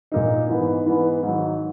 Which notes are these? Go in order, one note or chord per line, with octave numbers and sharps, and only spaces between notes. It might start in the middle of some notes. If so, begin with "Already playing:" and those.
A#2 A#3 D#4
G#2 E3 B3
G#2 E3 B3
G#2 D#3 F#3